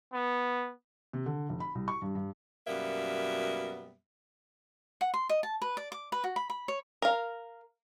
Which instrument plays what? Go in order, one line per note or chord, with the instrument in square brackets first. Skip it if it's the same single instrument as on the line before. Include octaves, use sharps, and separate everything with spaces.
[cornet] B3
[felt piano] C3
D3
F1
B5
C2
C#6
G2
G2
[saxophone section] F#2 B2 G3 A#3 B3 E5
[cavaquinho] F#5
C6
D#5
A5
B4
D5
D6
B4
F#4
B5
B5
C#5
[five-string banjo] A#4 F5